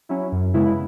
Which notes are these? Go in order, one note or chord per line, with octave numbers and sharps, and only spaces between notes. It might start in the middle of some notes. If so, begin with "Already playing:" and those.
F#3 C#4 E4
F#2
C#3 G#3 B3 E4